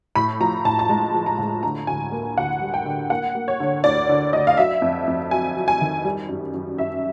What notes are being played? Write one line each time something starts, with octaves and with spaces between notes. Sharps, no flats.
A2 B5
F3 A#5
A2 A5
A5
G#3 A#5
F3
A#5
A2
D3 A#5
D2 G#5
A#3
D2 F#5
G3
G5
D3
A#3 F#5
A#3
C#5
D3
D2 D5
D3
D2 D#5
F5
F#3 E5
F2
F2
F#3 G#5
F#3
G#5
D#3
G3
F#2
F#2
F#2 E5